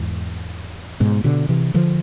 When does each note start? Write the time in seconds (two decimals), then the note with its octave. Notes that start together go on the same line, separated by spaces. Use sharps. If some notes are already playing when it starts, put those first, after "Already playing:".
Already playing: E2 G#2
1.00 G#2 B2
1.24 B2 D3
1.49 C3 E3
1.74 D3 F3